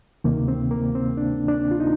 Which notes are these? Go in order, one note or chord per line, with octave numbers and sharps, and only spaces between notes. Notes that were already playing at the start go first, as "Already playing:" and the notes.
D2 C3 D#3 A#3
C4
A#3
C4
D4
D4
F4
D#4